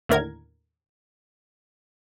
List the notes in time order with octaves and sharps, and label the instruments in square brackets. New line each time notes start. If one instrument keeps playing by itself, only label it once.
[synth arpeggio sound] D#2 A2 D3 A#4 G#6